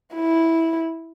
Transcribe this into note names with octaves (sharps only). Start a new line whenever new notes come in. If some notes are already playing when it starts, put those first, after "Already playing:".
E4